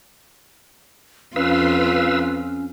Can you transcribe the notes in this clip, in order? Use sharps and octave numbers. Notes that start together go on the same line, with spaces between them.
F2 C#4 F4 B4 F5 E6